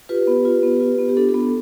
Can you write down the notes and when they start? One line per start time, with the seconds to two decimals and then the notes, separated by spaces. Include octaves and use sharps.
0.09 F4 G4 B4
0.27 B3
0.45 F4
0.63 B3
0.80 F4
0.98 B3
1.09 G4
1.17 D4 A4
1.29 A4
1.34 B3
1.41 A4